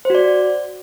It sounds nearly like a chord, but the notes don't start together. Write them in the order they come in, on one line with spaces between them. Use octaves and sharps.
C5 F#4 D5